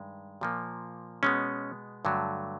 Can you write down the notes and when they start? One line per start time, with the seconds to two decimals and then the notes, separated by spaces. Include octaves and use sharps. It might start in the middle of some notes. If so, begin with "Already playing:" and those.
Already playing: G2 D#3 G#3
0.41 A#2 F3 A#3
1.23 B2 G#3 B3 C#4
2.05 G2 D3 F#3 A3